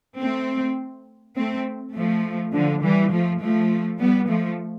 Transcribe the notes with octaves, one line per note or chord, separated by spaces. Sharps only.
A3 C4
A3 C4
F3 A3
D3 F3
E3 G3
F3 A3
F3 A3
G3 B3
F3 A3